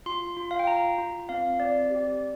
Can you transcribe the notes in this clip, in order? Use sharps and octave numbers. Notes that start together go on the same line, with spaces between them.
F4 C6
F4
F5
G5
F4 A#5
F4
C4 F5
C4 D5
G4